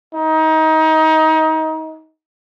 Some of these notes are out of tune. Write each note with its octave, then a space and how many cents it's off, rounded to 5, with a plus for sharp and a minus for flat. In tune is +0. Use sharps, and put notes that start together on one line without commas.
D#4 +25